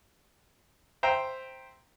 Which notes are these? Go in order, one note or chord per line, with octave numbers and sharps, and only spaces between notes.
C5 E5 G5 A#5